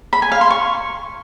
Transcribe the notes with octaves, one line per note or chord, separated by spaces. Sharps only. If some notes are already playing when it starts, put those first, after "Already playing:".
B5
G#5
F5
C6
C#6